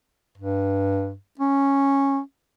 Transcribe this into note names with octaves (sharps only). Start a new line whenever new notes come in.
G2
C#4